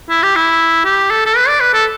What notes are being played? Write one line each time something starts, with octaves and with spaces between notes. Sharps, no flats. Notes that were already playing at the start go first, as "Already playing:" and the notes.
E4
G4
E4
G4
A4
A4
B4
D5
B4
A4